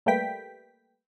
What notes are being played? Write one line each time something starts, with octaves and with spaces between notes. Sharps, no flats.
G3 A3 A#3 B4 G5 B6